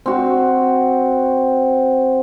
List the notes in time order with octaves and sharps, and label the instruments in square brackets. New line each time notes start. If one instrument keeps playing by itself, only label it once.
[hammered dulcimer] C4 F#4